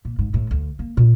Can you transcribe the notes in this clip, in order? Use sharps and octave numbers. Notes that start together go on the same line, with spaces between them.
A#2
G#2
A2
D2
A#3
A#2